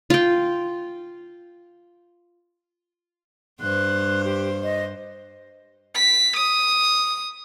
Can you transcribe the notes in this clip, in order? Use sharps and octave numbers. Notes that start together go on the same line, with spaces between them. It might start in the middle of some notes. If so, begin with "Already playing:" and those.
F4 G5
G2 C5 F#6
G4
D#5
B6
D#6